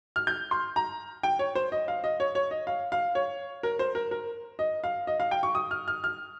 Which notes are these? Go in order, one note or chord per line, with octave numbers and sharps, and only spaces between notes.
F6
G6
C6
A#5
G5
C#5
C5
D#5
F5
D#5
C#5
C#5
D#5
F5
F5
C#5
A#4
C5
A#4
A#4
D#5
F5
D#5
F5
G5
C#6
D#6
F6
F6
F6